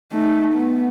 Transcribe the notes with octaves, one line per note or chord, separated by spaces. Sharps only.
A3 D#4
B3